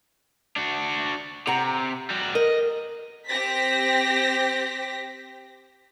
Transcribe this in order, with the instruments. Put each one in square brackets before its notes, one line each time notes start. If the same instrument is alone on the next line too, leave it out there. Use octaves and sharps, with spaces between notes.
[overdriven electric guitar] D4 F#4
[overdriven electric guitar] C3 [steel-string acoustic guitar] F#5 A#5
[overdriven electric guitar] G3 F#4
[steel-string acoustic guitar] A#4 [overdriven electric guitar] D#5
[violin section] C4 G4 C5 A#6 B6